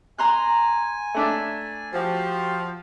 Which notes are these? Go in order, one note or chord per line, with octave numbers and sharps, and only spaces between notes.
G#5 A#5 C6 F#6
A3 D4 E5
F3 F#4 G4